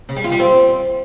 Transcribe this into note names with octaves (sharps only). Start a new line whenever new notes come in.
C#3
G3
F4
G3
C4